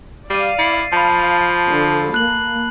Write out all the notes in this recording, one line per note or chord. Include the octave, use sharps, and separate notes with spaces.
G3 D5 F5 C7 D#7
E4 A6 C7
F3 F5 A5 B5
D3 A4
A#3 F#6 F#7